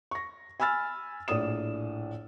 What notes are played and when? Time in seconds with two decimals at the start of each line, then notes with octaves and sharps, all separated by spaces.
0.11 C#6 A#6
0.60 G#5 B5 E6 F6 A6
1.28 A#1 A2 D5 D#6 E7